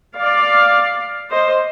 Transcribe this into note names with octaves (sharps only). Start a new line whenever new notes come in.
D5 F5
C5 D#5